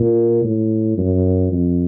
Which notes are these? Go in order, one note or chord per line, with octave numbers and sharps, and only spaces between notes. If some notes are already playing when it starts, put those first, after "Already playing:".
Already playing: A#2
A2
F#2
F2